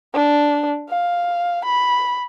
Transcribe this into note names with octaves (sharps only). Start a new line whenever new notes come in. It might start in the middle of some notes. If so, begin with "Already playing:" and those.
D4
F5
B5